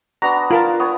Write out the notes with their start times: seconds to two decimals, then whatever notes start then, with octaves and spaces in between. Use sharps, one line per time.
0.22 B3 D4 F#4 A#5
0.51 F4 A#4 A5
0.79 B3 C#5 D#6